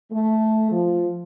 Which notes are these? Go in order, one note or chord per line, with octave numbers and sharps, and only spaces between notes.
A3
F3